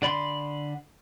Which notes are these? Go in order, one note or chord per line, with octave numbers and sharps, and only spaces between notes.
D3 D5 B5 C6